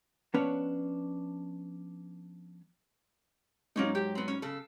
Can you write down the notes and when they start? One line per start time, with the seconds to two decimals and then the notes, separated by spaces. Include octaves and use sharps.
0.34 F3 B3 C#4 D4 B4 C#5
3.76 G#2 F#3 A#3 C#4 D#4
3.95 G4
4.15 B3 C4
4.28 C#4
4.42 C#3 A4